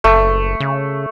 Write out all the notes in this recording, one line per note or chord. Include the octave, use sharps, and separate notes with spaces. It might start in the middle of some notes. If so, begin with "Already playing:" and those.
F#1 A3
C#3